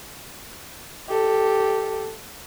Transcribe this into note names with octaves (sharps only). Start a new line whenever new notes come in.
G4 A4